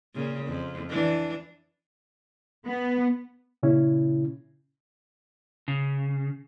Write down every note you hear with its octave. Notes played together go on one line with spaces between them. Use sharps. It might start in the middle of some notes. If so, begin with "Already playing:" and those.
A#2 C#3
F2
E3 D4
B3
A#2 C#3 C#4 E4
C#3